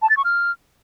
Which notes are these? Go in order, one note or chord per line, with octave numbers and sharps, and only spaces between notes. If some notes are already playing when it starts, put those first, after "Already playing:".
A5
A6
C#6
F6